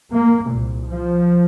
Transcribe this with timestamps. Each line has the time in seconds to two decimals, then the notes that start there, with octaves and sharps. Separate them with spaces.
0.12 A#3
0.49 C2 A#2
0.87 F3